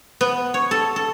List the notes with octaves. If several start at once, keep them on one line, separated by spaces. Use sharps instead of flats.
B3
C#5
A4
A4